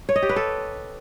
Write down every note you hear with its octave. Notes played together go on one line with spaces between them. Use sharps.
C#5
D#5
G4
B4
A4